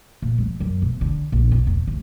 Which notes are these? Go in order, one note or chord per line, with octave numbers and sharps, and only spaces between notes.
A#2
F2
F#2
B2
D3
A#1
B2
E2
D2